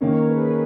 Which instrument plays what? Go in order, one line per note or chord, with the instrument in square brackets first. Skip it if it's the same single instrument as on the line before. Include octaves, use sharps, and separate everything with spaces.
[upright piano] D#3 A#3 C#4 [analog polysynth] A#4 C#5
[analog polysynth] G#4 B4